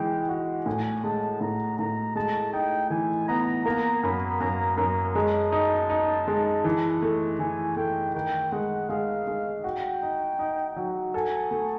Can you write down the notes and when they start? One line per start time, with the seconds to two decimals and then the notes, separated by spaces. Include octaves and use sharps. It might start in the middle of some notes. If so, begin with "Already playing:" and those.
Already playing: E3 G#3 G5
0.29 F#4
0.66 A2 G#5
1.04 G#3 A5
1.41 A2 A#5
1.79 A2 A#5
2.15 G#3 A5
2.53 D#4 G5
2.90 E3 G#5
3.28 B3 A#5
3.66 A#3 A#5
4.03 F#2 B5
4.40 F#2 A#5
4.77 F#2 A#5
5.15 G#3 A5
5.52 D#4
5.90 D#4
6.28 G#3
6.64 E3
7.02 A3
7.39 E3 G#5
7.77 A3 G5
8.15 D#3 G5
8.52 G#3 F#5
8.89 G#3 F5
9.27 G#3
9.64 F#4 G5
10.02 D#4
10.39 D#4
10.76 F#3
11.14 A4 G#5
11.51 A3